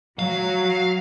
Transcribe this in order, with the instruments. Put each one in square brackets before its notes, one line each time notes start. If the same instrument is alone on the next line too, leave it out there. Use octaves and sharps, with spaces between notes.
[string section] F#3 [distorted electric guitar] F5